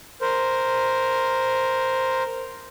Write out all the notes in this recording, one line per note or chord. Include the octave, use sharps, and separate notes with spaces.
A#4 C5